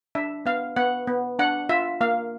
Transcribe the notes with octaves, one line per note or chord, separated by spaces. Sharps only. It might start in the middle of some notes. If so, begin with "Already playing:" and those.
D4 E5
B3 F5
B3 F#5
B3
D4 F#5
F4 E5
A#3 F5